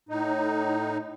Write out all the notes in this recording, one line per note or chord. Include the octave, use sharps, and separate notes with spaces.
A2 D#4